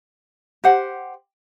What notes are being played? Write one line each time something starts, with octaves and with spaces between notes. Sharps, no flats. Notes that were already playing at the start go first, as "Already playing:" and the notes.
G4 C5 F#5